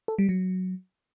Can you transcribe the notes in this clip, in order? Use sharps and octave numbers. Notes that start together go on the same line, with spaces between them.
A4
G3
F#3